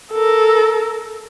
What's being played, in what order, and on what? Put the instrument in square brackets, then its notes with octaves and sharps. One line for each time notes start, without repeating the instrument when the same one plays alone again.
[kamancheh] A4 A#4